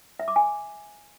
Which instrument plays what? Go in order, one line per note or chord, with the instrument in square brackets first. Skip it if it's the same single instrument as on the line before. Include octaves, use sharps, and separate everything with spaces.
[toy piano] E5
D6
G#5